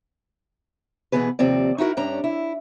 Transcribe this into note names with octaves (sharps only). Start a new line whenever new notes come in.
B2 E3 B3 G#4 B4
D#2 C3 F3 C4 D5
D#4 E4 F#4 A#4
G2 C#4 D4 A#5
E4